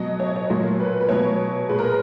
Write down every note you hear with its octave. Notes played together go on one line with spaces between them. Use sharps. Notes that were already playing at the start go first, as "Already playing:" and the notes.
Already playing: B2 F#3 D#5
C#5
D#5
C#5
A#2 F#3
B4
B4
B2 F#3 C#5
A#2 G#3 B4
A#4